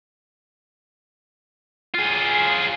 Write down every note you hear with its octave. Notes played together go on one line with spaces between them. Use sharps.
F4 G#4